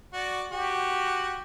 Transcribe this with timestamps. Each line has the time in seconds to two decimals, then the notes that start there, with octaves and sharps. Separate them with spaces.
0.13 F#4 D5
0.52 F#4 G4